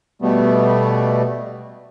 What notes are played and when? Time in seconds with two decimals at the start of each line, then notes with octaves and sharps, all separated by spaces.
0.22 B2 G3 A3 B3